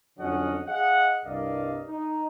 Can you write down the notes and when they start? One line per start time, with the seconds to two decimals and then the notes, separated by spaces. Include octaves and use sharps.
0.19 F2 D3 F#3 C#4 D#5 F#5
0.68 G#4 D#5 F5 F#5
1.25 C2 G2 A#4 D5 D#5 F5
1.88 D#4